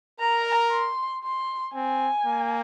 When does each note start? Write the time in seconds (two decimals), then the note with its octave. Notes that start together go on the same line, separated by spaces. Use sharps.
0.20 A#4 A#5
0.71 C6
1.24 C6
1.74 C4 G#5
2.26 A#3